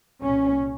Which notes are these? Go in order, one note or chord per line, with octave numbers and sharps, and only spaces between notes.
C2 A#2 C#4